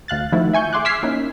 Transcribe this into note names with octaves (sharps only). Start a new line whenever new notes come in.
D2 F5 F#6 A6
D#3 F3 A3 E4 F#4
E5 G#5 C#6 G6
G#4 E5 C6 D6 F#6
D6 E6 F6 G#6 B6 C7
A#3 C#4 D#4 E4